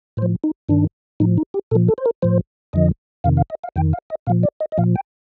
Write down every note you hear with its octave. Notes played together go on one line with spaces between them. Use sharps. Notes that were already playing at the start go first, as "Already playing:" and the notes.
A2 C5
F3
D#4
G2 D#3 D4
A2 F3 D#4
D#4
G4
A#2 F3 A4
A4
C5
A#4
A2 F3 C5
F2 D3 F3 D#5
F2 C3 D#3 F5
F5
D#5
F5
F2 D#3 G5
F5
D#5
A#2 F3 F5
D5
D#5
D#5
A#2 F3 F5
G5